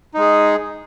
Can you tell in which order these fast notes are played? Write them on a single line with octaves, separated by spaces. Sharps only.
D#4 G#3 G#4